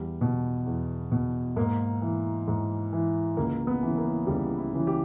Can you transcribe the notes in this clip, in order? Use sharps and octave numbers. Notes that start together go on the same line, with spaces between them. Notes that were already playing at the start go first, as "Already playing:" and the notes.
Already playing: E2 G3
B2
E2
B2
G#2 A#3
E3
G#2
E3
C#2 A#3
B3
C#3 E3
A#3
C#2 G3
E4
C#3 E3
G4